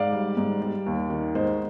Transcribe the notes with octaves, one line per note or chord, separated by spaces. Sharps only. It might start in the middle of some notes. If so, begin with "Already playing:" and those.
Already playing: G#2 D5 F5
G3
G#2
G3
D#2
D#3
G#2 C5 D#5